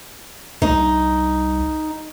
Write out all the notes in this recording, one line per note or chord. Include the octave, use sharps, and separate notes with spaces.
C2 D#4